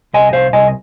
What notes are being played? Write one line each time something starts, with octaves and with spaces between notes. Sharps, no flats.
C2 D#5 G#5
C2 C5 F5
C2 D#5 G#5